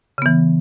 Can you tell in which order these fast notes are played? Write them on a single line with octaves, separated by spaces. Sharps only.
C#3 B3 E3